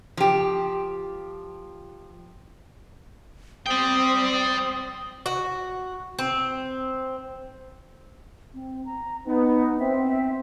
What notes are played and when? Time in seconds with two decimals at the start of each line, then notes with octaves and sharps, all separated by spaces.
0.17 F3 G4
3.67 C4 D5 G5 D#6
5.26 F#4
6.19 C4
8.54 C4
8.86 A#5
9.26 B3 D#4
9.79 C4 E5